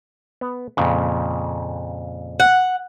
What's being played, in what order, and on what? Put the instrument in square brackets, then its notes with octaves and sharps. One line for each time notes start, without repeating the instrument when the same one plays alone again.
[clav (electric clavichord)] B3
F2 A#2 C#3
[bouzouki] F#5